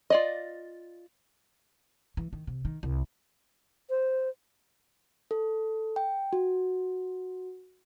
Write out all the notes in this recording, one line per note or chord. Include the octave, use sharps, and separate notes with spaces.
F4 D5 D#5
E3
D#3
C3
D#3
C2
C5
A4
G5
F#4